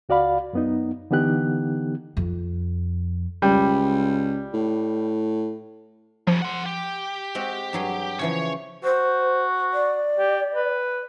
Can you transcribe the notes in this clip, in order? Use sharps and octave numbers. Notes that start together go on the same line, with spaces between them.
C#2 F#4 D5 F5 B5
F#2 B3 D#4
D3 E3 B3 D#4 G4 F#6
F2
C#2 G3
A2
F#2 C#3 F3
F#5 C6
G4
G#3 C4 F#4
G2 F#3 G#4
C#3 E3 F3 C#5
F#4 C5
D5
G4
B4